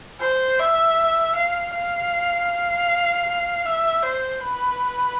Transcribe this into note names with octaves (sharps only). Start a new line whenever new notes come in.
C5
E5
F5
F5
E5
C5
B4